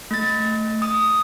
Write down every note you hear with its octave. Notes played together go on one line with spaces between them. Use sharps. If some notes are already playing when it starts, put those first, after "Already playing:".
A3 A6
D#6